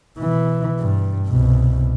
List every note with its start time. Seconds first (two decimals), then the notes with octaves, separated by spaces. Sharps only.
0.18 B2 E3
0.80 G2
1.28 C2 B2